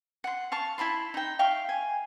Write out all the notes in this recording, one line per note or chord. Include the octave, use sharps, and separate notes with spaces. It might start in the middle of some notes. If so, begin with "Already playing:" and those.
F#5 C6
F5 A5 C#6
E4 A5 B5 C6
D#4 G5
E5 F5 G5 C#6
G#5